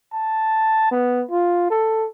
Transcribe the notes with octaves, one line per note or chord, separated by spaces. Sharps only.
A5
B3
F4
A4